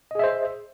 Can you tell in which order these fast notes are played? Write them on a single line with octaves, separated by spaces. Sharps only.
D#5 G#4 E5 C5